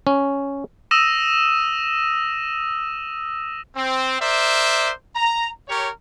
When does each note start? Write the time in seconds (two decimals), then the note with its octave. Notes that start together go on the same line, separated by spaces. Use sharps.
0.07 C#4
0.91 D#6 E6 A#6 D#7 E7
3.76 C4
4.20 A#4 C5 D5 E5
5.15 A#5
5.68 G4 A#4 C#5